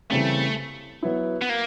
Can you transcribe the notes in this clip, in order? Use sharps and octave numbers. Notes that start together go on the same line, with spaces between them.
C#3 E3 G3 A3 C4
F#3 B3 E4
B3
A#3